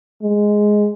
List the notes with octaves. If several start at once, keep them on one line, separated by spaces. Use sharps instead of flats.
G#3